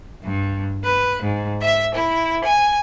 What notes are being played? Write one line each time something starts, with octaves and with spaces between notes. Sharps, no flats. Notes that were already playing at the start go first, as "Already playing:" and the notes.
G2
B4
G#2
E5
E4
G#5